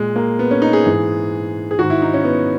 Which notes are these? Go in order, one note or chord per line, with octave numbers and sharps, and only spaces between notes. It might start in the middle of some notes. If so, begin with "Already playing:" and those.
Already playing: A#2 G#3
A#3
B3
C#4
D#4
G#4
G#2 E3
G#4
G#2 D#3 F#4
E4
D#4
C#4
B3